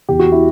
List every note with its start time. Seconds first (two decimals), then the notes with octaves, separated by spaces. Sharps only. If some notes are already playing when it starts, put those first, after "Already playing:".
0.09 E2 G4
0.19 F#4
0.32 E4